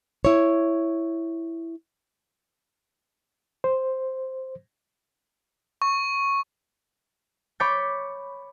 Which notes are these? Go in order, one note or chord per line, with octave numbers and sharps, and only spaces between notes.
E4 C#5
C5
C#6
C#5 B5 C#6 D6 G6 A6